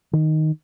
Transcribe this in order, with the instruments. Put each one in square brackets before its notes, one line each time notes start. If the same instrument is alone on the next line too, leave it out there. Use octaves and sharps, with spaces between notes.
[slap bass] D#3